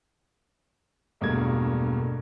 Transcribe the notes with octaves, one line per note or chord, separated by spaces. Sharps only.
E1 G2 B2 A3 A#3 G#6